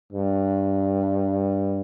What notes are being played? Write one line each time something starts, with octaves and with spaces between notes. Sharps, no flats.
G2